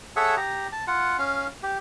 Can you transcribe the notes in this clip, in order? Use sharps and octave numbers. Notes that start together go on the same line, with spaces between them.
G#4 A4 C#5 E5 F#5
G4 A#5
A5
F4 F#5
C#4 F5
G4